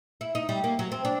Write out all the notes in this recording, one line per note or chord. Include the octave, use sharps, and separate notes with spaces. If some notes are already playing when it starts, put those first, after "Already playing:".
E4
D#4
G3
A#3
F#3
C4
D4